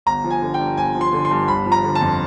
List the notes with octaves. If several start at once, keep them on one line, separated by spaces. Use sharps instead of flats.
G1 A#5
F3
G#5
D3
G5
G2
G1 G#5
F3
C6
D3
C6
G2
G1 B5
F3
A#5
D3
A5
F2